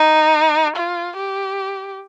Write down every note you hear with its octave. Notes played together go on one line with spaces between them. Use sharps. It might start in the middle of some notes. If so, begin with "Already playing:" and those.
Already playing: D#4
F4
G4